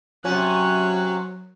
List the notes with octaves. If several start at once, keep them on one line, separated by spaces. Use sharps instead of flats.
C3 F#3 C#4 F#6